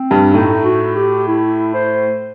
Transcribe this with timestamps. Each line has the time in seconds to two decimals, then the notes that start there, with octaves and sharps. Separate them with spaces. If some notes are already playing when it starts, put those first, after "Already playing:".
Already playing: C4
0.10 G2 G3
0.33 A2 A3 D#4
0.64 F#4
0.95 G4
1.27 E4
1.74 C5